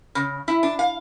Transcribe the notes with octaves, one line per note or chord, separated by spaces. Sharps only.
C#3
E4
D4
F5